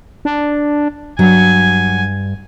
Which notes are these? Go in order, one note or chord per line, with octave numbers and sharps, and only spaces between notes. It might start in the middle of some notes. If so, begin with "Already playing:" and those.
D4
G2 F#3 G#5